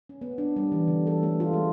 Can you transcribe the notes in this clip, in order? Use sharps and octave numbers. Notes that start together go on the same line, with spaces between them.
C#4
B3
D4
G3
E3
D3
A4
A3
F4
G#3